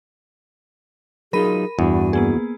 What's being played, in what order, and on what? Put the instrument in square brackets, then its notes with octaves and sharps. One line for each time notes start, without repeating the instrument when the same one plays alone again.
[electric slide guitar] F#3 D#4 F4 [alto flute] G#4 [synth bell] A#4 B5 D#7
[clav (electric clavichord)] E2 [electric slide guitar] G2 D4 [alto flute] F#4
[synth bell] A#3 B3 G#4